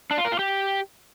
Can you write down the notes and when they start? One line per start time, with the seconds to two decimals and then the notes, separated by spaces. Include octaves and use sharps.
0.11 D4
0.18 F4
0.25 A#4
0.32 F4
0.39 G4